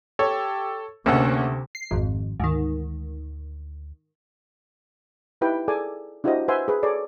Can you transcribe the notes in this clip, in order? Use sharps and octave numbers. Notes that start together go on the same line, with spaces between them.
G4 A4 C#5
D2 C3 A3 A#3 C#4 A4 F#5
C7
G#1 F2 G#2
D2 G#2 D#3
D#4 E4 G4 B4 G5
G#4 A4 D5 G#5 D6
D4 E4 F#4 G4 C5 D#5
B4 C5 E5 F#5 G#5 C6
G#4 B4
G#4 A4 C#5 D5